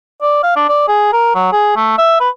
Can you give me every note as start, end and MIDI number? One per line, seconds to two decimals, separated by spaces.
0.22 0.39 74
0.43 0.54 77
0.56 0.66 62
0.69 0.84 74
0.88 1.10 68
1.13 1.32 70
1.35 1.52 54
1.53 1.73 68
1.76 1.95 57
1.98 2.18 76
2.21 2.29 71